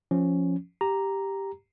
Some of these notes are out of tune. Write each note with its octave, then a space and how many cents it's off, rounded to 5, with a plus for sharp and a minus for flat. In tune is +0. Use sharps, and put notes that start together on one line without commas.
F3 +5 C#4 +0
G4 +0 A#5 +0